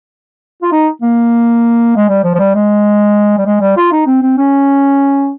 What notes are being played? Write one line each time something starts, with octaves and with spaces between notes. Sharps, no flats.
F4
D#4
A#3
G#3
G3
F3
F3
G3
G#3
G3
G#3
G3
F4
D#4
C4
C4
C#4